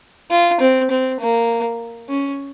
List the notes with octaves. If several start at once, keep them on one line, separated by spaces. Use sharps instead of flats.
F4
C4
C4
A#3
C#4